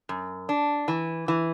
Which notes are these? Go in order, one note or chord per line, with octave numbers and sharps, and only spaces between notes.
F#2
D4
E3
E3